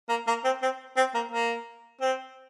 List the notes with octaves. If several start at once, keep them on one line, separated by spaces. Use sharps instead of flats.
A#3
A#3
C4
C4
C4
A#3
A#3
C4